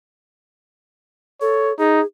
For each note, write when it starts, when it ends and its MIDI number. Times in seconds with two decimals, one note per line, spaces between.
1.41 1.73 69
1.41 1.72 73
1.78 2.01 63
1.78 2.05 68